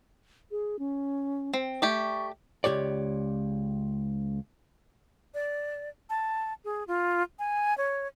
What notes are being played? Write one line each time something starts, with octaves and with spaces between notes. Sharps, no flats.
G#4
C#4
C4
A3 G4 D5 C#6
C#2 E3 G4 C#5 D5
D5
A5
G#4
F4
G#5
C#5